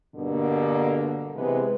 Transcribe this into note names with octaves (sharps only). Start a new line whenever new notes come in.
G2 B2 D3 A#3 D4
C3 E3 G#3 B3 B4